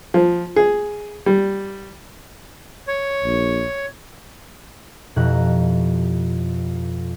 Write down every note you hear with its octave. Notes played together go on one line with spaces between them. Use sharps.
F3
G#4
G3
C#5
A#1
F2 B2 E4 G4 A#5 F#6